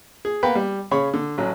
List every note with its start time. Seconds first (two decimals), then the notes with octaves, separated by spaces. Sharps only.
0.25 G#4
0.43 A#3 B3 B4 G5
0.55 G3
0.91 C#3 C#5 B5
1.14 D3
1.38 A1 F#3